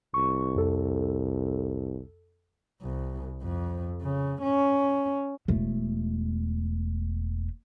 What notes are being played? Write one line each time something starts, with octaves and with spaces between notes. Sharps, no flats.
C2 C#6
F2 A4
C2
F2
C#3
C#4
E1 A3